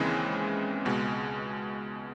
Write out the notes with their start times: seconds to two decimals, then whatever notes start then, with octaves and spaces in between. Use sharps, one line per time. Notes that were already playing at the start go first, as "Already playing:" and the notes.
Already playing: D#2 C#3 E3 G#3 C4
0.85 C#2 B2 G#3